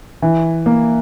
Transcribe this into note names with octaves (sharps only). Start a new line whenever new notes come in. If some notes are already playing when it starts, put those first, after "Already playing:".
E3
A#3